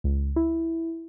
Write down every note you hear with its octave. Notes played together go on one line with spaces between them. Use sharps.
C#2
E4